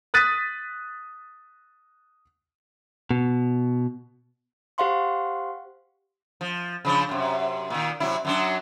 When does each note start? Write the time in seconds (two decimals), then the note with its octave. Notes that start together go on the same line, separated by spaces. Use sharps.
0.14 D#6 F#6 A6 B6 D#7
3.11 B2
4.78 G4 C5 F5 F#5 C6 C#6
6.41 F3
6.85 C#3 F3 D4
7.09 F#2 C3
7.70 A#2 D#3
8.00 C3 F#3 E4
8.25 F#2 F#3 D4